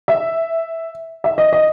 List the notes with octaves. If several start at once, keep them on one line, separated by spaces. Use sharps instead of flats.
E5
E5
D#5
D#5